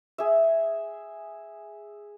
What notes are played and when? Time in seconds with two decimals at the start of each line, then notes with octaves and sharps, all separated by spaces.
0.18 G#4 E5